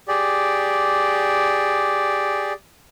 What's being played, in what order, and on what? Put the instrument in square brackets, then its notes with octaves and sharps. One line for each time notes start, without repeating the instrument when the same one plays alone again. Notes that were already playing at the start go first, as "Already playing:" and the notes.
[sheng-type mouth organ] G4 G#4 D5